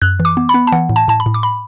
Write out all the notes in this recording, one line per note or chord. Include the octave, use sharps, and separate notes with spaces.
F#2 F#6
E3
D6
B3
B5
B3
A5
E3 F#5
A2
A5
A2 A5
B5
A2
D6
B5